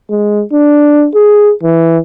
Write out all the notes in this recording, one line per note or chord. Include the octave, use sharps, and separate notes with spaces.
G#3
D4
G#4
E3